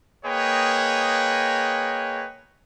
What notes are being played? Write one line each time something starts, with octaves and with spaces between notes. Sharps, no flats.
A#3 G#4 B4 C#5 D#5 G5